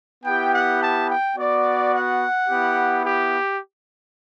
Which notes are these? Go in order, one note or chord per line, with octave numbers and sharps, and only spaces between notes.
B3 E4 G4 G5
F#5
A5
G5
B3 F#4 D5
F#5
B3 E4 G4
G4